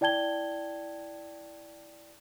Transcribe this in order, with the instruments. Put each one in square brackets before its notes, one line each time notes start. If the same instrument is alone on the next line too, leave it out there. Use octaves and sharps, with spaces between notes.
[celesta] E4 D5 G5 A5 G#6 G7